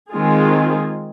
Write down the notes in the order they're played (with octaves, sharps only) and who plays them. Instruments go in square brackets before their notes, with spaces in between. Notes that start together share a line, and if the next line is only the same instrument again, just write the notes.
[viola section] D#3 G#3 C4 F4 G#4